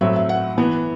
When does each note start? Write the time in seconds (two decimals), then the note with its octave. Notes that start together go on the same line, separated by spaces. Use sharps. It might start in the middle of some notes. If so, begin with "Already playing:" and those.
0.01 A2 F#3 C4 E5
0.16 E5
0.29 F#5
0.58 E3 B3